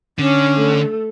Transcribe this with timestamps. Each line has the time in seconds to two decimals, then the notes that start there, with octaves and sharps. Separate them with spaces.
0.19 D3 C#4
0.55 A3 A4